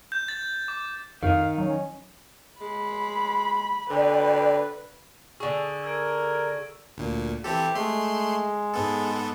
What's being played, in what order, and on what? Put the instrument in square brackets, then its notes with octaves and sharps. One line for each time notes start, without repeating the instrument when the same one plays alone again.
[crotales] G6
A6
D6
[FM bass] F2 [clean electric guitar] D#3 D#4 [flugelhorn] F5
[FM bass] F#3 [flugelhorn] C#4
[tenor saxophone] G#3 [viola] B5
[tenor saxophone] D3 [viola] B4 [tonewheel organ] D5 G5
[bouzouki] D3 G#4 [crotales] C#6 E6
[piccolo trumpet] A#4 [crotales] E6 G#6 D7
[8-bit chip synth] D2 A#2
[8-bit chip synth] E3 C4 A4 [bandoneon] G4
[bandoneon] G#3 [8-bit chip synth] A3 C6
[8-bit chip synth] G#2 B3 A4